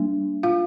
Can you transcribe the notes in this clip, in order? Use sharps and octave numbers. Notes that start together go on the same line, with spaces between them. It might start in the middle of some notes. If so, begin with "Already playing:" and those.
Already playing: G3 A#3 D4
F4 F5